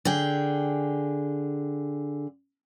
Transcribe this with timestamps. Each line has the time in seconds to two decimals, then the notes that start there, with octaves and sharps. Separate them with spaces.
0.05 D3 G#4 G5